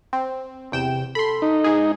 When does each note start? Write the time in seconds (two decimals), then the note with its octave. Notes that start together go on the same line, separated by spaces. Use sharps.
0.13 C4
0.72 E2 C3 G5 E7
1.15 A4 B5 C6
1.42 D#4
1.64 G#2 G#4